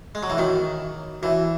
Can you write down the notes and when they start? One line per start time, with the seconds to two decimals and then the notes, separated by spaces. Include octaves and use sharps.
0.15 G#3
0.23 F#3
0.30 E3
0.37 D#3 F#4 C#5 E5
1.22 E3 F#4 C#5 E5